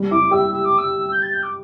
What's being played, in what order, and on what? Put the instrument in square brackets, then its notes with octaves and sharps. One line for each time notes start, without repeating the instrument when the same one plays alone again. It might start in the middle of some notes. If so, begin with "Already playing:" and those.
Already playing: [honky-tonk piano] G3
[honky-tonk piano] E4 [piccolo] D6
[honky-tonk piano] G4 [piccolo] E6
[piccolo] E6
D6
E6
G6
A6
G6
D6